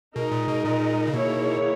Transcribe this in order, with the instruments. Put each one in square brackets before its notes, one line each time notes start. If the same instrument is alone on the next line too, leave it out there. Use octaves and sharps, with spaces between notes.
[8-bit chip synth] B2 [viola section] G#3 D#4 A#4 D#5
[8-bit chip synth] A#2
B2
A#2
C#3
[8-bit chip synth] B2 [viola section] D#3 A#3 E4 G#4 C#5